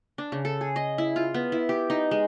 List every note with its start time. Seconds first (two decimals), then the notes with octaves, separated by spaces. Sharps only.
0.18 D4
0.32 C#3
0.45 A4
0.61 G#4
0.76 D#5
0.98 E4
1.16 F4
1.34 B3
1.52 E4
1.69 G4
1.90 D#4
2.11 G#3